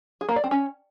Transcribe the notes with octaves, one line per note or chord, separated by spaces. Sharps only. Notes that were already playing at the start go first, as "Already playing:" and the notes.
G#4
A#3
D5
C4
C#4